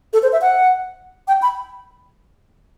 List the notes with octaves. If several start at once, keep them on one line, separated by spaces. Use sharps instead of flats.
A4
C5
E5
F#5
G5
B5